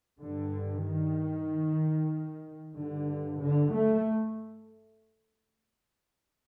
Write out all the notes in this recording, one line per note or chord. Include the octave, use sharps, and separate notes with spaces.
G2 D3
D#3
G2 D3
D3
A3